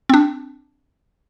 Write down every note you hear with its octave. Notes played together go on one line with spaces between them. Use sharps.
C4 D4